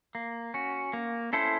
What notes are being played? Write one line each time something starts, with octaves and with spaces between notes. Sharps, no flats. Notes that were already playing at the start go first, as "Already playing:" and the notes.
A#3
C#4 F#4
A#3
C#4 E4 A4 C5